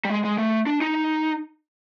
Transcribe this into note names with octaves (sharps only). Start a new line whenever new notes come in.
G3
G#3
G#3
A3
D4
D#4